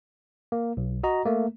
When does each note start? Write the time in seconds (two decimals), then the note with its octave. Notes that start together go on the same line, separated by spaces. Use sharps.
0.52 A#3
0.77 B1
1.04 F#4 D#5 A#5
1.26 A3 A#3